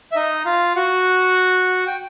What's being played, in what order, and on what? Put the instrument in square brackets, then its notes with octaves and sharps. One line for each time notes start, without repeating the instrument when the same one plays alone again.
[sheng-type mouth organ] E5
D#4 D#5
F4 F5
F#4 F#5
G5